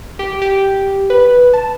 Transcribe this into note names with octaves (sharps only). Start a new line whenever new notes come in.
G4
G4
B4
A5